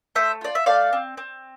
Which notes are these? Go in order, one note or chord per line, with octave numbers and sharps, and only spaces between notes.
A3 C5 E5
F4 D5
E5
A3 D5 F5
C4
C4